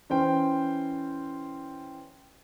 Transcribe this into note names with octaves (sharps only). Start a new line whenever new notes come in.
E3 C#4 C5 G5